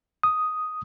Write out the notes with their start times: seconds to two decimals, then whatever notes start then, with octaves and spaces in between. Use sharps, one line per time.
0.23 D#6